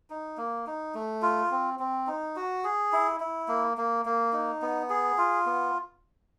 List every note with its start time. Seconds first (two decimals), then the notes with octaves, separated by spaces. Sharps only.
0.10 D#4
0.37 A#3
0.67 D#4
0.95 A3
1.22 F4
1.51 C4
1.79 C4
2.07 D#4
2.36 F#4
2.64 G#4
2.93 E4
3.20 E4
3.48 A#3
3.77 A#3
4.05 A#3
4.33 D#4
4.62 B3
4.90 G#4
5.18 F4
5.46 B3